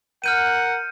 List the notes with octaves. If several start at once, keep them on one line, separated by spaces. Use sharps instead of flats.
A#4 F#5 F6 G6 D#7